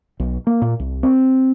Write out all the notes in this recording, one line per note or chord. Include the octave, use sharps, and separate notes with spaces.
B1
A#3
A#2
C2
C4